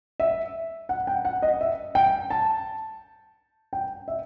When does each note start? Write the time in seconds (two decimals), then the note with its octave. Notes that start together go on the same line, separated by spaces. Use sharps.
0.20 E5
0.89 F#5
1.07 G5
1.25 F#5
1.42 D#5
1.61 E5
1.95 G5
2.30 A5
3.73 G5
4.08 E5